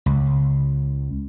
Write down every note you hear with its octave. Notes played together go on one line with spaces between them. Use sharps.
C#2